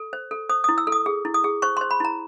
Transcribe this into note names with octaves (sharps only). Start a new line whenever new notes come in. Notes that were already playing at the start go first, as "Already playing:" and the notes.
Already playing: A4
C5
A4
C5 D#6
D#6
E4
E6
A4
D#6
G#4
E4
D#6
G#4
C5 C#6
C6
C5
B5
E4 A#5